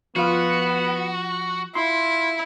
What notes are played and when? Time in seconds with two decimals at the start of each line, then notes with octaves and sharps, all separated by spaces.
0.16 F3 B3 F4 F#4
1.75 E4 F4 C6